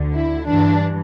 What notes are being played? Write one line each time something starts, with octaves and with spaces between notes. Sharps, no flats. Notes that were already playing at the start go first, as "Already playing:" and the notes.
Already playing: D2 D3
E4
G2 E3 D4